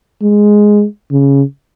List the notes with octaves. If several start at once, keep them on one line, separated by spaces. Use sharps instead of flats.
G#3
C#3